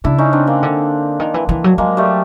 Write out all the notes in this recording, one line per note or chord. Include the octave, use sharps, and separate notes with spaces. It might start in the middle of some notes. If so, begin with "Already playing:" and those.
C#3 D4 E4
C#4 D#4
C4 D4
A#3 C4
D3
D#3
E3
E3
F#3
F#3 G#3 A#3
G3 A3